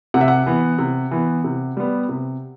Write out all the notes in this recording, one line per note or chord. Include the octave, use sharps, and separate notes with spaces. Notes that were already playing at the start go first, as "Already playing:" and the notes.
C3 F#5
E5
F#5
E3 B3
C3
E3 B3
C3
G3 B3
C3